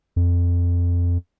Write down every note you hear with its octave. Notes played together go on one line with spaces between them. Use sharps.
F2